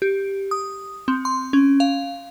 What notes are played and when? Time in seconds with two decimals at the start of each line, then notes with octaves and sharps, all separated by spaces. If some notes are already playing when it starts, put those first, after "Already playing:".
0.02 G4
0.51 D#6
1.08 C4
1.25 C6
1.53 C#4
1.80 F5